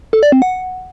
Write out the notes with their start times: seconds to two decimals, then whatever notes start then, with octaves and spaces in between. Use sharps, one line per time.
0.13 A4
0.23 D5
0.32 C4
0.42 F#5